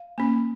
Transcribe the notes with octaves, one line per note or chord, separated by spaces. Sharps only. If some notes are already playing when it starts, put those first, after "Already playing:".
Already playing: F5
A#3 C#4